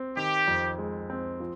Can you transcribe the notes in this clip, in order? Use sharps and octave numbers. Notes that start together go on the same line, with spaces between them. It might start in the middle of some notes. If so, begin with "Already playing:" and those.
Already playing: C4
D#3 G4
F2
G#3
C4
F3